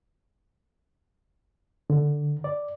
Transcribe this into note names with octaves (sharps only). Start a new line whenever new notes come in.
D3
D5